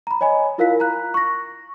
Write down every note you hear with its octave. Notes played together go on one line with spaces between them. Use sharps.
A#5 B5
C#5 D#5 G#5 B5
E4 F4 A#4 F5 F#6 B6
A#5 F#6
C#6 A#6